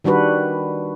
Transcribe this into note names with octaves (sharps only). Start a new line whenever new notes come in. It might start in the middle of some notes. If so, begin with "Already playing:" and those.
D#3 G3 D4 F#4 B4